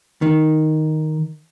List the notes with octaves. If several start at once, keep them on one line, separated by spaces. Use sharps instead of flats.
D#3